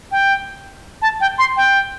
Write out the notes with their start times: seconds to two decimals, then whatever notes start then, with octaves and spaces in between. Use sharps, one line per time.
0.12 G5
1.02 A5
1.21 G5
1.39 C6
1.57 G5